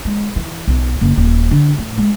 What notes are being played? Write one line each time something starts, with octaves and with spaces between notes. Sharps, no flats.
G#3
E3
B1
F#1
D#1
D3
A2
G#3